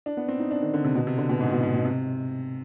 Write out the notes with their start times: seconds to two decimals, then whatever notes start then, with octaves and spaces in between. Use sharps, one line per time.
0.06 D4
0.17 B3
0.28 C4
0.39 D#4
0.51 D4
0.62 D#3
0.74 D3
0.84 C3
0.95 B2
1.07 C3
1.18 D3
1.29 B2
1.40 G#2
1.51 B2
1.63 G#2
1.74 B2
1.85 C3